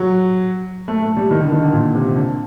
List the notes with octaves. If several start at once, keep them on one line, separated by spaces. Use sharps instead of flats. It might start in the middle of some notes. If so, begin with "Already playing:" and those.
Already playing: F#3
A3
A3
G3
D#3
D3
D#3
D3
A#2
C3
D3